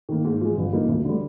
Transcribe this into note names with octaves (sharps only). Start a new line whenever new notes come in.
D#3 A#3
G#2
F3 G#3
G1
G2 F3 A#3 D#4
D2
D3 G3